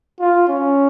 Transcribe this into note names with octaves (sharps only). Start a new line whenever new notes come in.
F4
C#4